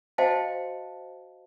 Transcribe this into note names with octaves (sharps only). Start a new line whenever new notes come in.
F#4 C5 D#5 F5 G5 A5